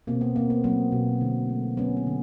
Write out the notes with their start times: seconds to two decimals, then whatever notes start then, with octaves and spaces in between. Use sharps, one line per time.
0.07 B2 A#3 C4
0.21 B3
0.36 A#3 C4
0.50 B3
0.64 F#3 A#3 C4
0.92 B2
1.21 D3
1.49 A3
1.77 F#3 B3 C#4
1.97 B3
2.07 D3